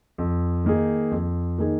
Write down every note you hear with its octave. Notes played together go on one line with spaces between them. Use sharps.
F2
D#3 A#3 D#4 G#4
F2
D#3 A#3 D#4 G#4